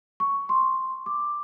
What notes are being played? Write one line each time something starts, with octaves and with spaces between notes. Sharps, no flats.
C#6
C6
D6